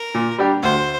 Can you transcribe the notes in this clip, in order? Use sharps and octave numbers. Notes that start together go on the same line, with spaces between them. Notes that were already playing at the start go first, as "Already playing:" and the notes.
Already playing: A#4
A#2
G3 D4 G4
D2 C5